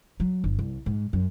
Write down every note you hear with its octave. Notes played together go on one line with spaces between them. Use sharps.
F#3
G1
C2
G#2
F#2